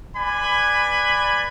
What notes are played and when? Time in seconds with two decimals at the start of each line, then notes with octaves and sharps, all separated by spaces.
0.16 B4 D5 G#5 B5